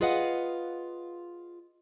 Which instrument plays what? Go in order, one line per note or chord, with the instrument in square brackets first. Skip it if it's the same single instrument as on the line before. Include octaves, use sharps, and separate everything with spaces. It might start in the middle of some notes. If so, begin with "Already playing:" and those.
[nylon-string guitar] F4 G#4 B4 D#5 F5 F#5